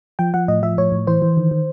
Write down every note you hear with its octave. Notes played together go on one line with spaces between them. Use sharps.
F3 G5
F3 F#5
A2 D#5
F3 E5
A2 C#5
A2
E3 C5
E3
D#3
D#3